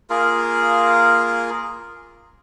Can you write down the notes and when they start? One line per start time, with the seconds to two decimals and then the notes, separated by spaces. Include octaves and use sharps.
0.10 A#3 F4 G#4 A#4